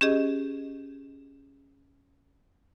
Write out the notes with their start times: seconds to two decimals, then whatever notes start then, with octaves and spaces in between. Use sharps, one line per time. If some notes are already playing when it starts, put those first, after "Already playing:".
0.01 C#4 G4 G#4 D#5